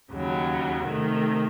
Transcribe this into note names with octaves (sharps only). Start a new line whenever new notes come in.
D#2 C#3 F#3
C3 D#3 A3